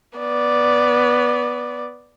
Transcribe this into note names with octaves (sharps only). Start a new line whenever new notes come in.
B3 D5